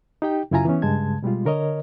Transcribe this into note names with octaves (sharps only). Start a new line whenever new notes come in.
D#4 G4 G5
F#2 C#3 E4 F4 G#5 A#5
E3 B3 C#4
G2 C#3 G#3 A5 G#6
B2 G3 G#3 F4
D3 A#4 C#5 D#5